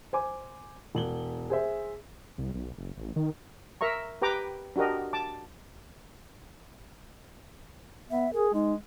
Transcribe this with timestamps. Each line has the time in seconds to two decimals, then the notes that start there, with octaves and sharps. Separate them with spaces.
0.13 C5 G#5 D6
0.95 E1 F#7 G7
1.50 G#4 C5 E5
2.38 C2
2.54 B1
2.78 F#1
2.98 A1
3.16 D#3
3.81 A#4 E5 A#5 C#6
4.22 G4 B4 G5 A#5 D6
4.76 D4 F#4 G4 A#4 D#5
5.13 A5 D6
8.10 B3 E5
8.33 G#4 A#4
8.54 G#3 D#4